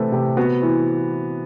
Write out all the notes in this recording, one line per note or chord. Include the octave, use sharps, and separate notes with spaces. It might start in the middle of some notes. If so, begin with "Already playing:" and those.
Already playing: C3 E3 A3 C4 A4 B4
C3 G4
B3 F#4
E3 E4